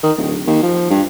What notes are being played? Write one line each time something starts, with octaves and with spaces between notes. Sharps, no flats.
D#3
D1
D#2
F3
G2